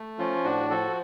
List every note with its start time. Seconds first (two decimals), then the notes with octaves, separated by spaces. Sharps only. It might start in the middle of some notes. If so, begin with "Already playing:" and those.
Already playing: A3
0.18 F3 C#4 F4
0.44 A2 D4 F#4
0.70 F3 F#4 A4